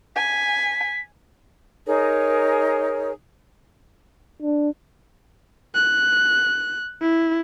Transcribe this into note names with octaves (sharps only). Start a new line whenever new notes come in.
G#5 B6
D#4 G#4 A#4 C#5
D4
F#6
E4